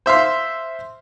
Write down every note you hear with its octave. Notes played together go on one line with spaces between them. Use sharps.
C5 E5 F5 C6